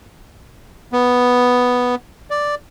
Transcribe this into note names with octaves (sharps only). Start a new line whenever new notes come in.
B3
D5